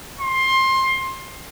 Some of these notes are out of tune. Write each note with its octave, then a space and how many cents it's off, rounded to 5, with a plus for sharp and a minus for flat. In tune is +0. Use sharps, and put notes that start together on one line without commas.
C6 +20